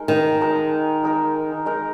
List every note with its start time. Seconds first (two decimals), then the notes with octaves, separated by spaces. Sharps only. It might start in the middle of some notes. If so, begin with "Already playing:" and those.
Already playing: G#3 D#4 A#4
0.08 D#3
0.41 G#3 D#4 A#4
1.03 G#3 D#4 A#4
1.66 G#3 D#4 A#4